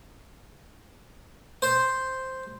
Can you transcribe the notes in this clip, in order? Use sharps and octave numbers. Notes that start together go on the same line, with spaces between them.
C5